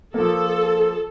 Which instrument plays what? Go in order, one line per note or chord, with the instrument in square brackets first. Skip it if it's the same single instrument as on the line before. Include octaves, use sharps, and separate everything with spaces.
[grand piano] F3 A#3 [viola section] A4